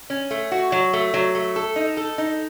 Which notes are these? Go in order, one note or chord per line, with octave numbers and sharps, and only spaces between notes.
C#4
A3
F#4
F#3
A3
F#3
A3
A4
D#4
A4
D#4